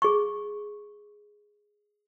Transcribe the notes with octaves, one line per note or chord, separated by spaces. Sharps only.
G#4 C#6